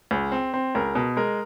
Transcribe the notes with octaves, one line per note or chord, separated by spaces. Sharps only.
C#2
C4
C4
C#2 A#4
B2
G#3 A#4